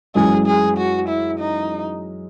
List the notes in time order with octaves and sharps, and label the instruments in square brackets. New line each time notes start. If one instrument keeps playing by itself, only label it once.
[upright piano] F#2 E3 G#3 C#4 [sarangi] G#4
[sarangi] G#4
F#4
E4
D#4